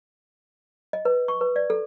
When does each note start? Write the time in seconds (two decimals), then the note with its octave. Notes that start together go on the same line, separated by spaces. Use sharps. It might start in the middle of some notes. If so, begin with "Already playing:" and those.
0.93 D#5
1.05 B4
1.28 C#6
1.41 B4
1.56 D5
1.70 A4